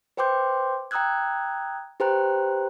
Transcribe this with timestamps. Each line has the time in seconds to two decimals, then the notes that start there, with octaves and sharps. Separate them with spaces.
0.17 B4 C5 G5 C6 D6 G6
0.91 G5 A#5 D#6 E6 F#6 G#6
2.00 G4 B4 C5 G5 A#5 F#6